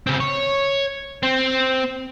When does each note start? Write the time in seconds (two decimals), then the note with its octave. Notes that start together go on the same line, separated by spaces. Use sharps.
0.07 C#3 C4
0.20 C#5
1.23 C4